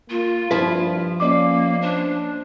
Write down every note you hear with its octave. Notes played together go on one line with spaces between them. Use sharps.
A#3 F4
G2 F3 E4 B4
A#3 C#4 D5 D#5 D6
D4 C5